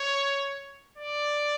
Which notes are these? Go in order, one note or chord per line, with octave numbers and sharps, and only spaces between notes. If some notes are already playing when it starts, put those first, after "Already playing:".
Already playing: C#5
D5